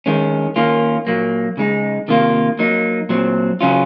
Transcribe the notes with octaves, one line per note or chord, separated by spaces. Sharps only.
D#3 G#3 C#4
D#3 A#3 C#4 F4
A#2 F#3 A#3
C#3 G#3 D#4
C3 D#3 A#3 F4
F#3 A#3 D#4
A#2 F#3 C4
C#3 F#3 C#4 F4